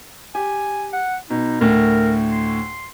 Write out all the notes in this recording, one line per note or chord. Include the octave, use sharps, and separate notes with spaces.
G4 G#5
F#5
B2 D#4
D2 A2 A#4
C6